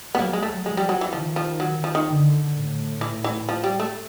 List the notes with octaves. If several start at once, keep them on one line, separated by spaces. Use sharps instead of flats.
B3
F#3 A#3
G#3
A3
F3 G#3
G3
F#3
E3
D#3 F3
F3
F#3
F3
D#3
D3
A2
E3
E3
F3
G3
A3